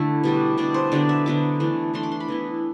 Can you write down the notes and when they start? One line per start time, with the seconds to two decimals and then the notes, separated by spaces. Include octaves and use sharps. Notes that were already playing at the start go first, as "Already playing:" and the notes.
Already playing: D3 A3 D4 E4 E5
0.23 B2 G3 D4
0.57 B2 G3 D4 D5
0.74 C5
0.92 D3 F#3 B3 D4 D5
1.09 E5
1.26 D3 F#3 B3 D4 D6
1.60 E3 A3 D4
1.94 E3 A3 D4 C6
2.03 D6
2.12 C6
2.20 B5
2.28 E3 B3 E4